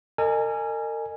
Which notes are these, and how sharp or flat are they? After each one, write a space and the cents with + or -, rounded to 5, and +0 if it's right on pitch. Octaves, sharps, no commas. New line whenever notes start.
A#4 -40 D#5 -30 G#5 +0